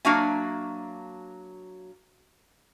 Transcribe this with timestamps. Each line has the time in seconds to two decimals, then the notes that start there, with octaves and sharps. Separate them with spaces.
0.05 F#3 A#3 D4 F#4 E5 G#5